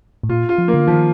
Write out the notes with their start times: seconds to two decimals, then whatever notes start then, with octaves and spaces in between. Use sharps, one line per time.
0.23 A2
0.29 A#2 F4
0.49 F4
0.58 F3
0.68 A#3
0.74 D3
0.87 D#3 F3